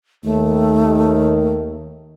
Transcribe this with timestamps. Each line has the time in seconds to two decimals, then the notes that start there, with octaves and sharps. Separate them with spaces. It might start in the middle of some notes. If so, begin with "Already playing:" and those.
0.24 D#2 D#3 A3